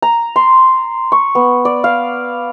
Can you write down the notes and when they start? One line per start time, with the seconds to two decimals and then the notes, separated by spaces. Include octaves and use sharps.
0.02 A#5
0.36 C6
1.12 C#6
1.35 B3
1.65 D5
1.84 F5